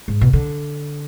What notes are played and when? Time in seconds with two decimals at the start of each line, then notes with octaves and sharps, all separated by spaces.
0.08 G#2
0.21 B2
0.33 D3